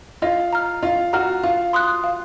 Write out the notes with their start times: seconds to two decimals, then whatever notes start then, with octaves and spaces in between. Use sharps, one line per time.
0.22 F4 D#5
0.53 A#5 F6
0.83 F4 D#5
1.13 F#4 A#5 F6
1.43 F4 F5
1.73 C6 D#6 F#6
2.04 F5